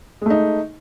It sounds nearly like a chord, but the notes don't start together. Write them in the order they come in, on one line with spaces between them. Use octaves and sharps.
G#3 A3 D#4